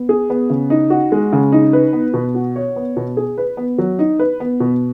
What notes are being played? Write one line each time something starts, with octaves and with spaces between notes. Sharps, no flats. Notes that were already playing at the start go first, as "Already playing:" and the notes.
Already playing: B3
G#4
B3
C#3
D#4
F#4
G#3
C#3
D#4
B4
B3
B2
F#4
C#5
B3
B2
G#4
B4
B3
F#3
D#4
B4
B3
B2